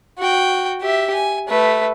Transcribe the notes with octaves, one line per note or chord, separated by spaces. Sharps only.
F#4 G5
G4 E5
G#5
A3 B4